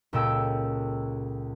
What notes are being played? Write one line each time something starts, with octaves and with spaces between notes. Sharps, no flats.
C#2 A#2 C#4 A4 G5 E6